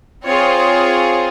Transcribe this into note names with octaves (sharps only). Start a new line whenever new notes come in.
C4 F4 G#4 C#5
C#5